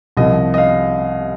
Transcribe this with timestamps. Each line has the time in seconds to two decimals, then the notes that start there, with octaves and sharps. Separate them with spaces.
0.17 C2 C3 F3 D#5
0.54 D#5
0.58 F5